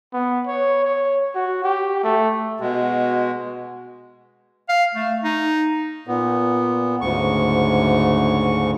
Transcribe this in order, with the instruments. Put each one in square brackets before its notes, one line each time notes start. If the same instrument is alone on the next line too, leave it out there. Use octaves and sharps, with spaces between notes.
[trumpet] B3
C#5
C#5
F#4
G4
A3
[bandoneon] B2 G#3 [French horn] F#4
[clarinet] F5
A3
D#4
[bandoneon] A#2 B3
D2 G#2 C#3 C#6